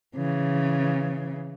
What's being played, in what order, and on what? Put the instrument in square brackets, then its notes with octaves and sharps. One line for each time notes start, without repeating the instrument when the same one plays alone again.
[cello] C#3 E3